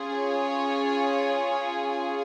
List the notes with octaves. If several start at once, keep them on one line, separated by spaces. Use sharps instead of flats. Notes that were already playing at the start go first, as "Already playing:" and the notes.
Already playing: C#4 F4 G#4
C#5